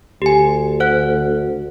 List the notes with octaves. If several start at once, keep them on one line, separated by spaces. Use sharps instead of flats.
D2 G4 G#5
C5 F#5 F#6